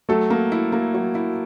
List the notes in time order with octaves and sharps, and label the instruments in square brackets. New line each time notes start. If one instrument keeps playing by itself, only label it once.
[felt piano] F#3 [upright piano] A3 A4
[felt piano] A#3
E4
A#3
F#3
E4